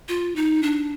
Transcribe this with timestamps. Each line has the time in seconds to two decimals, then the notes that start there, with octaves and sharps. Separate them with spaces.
0.09 F4
0.36 D#4
0.63 D4